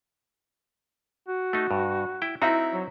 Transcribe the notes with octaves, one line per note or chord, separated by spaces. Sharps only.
F#4
A3 D#4
G2
E4 G5
C4 D#4 E4 F#4 E5 A#5
F#3